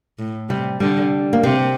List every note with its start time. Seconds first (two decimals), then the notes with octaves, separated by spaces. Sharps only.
0.19 A2
0.49 C3 G3
0.80 D3 G3
1.33 A#3
1.43 C3 C4